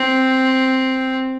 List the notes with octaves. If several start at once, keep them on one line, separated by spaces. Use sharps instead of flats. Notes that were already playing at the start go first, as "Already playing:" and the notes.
Already playing: C4